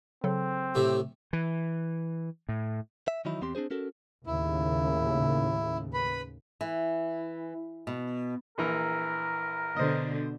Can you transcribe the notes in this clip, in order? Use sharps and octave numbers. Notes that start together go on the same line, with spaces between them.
C#3 F#3 C4 A4
A2 C3 G4 E5
E3
A2
E5
D#3 E3 F#3 D#4 E4
E2 C4 G4 C6
C4 D4 D#4 G#4 C5
C#4 F#4 A4 A#4
D#2 A2 C#3 E4
B4 B5
E3
B2
A#1 E3 A#4 A#5
B2 D3 C5 D#5